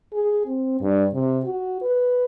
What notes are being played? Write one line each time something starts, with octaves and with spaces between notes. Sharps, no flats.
G#4
C4
G2
C3
F#4
B4